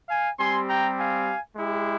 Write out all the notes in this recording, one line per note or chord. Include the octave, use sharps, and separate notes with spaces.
F5 G#5
G3 C4 G4 G#5 C6
G5 A#5
F5 G#5
G#3 E4 G4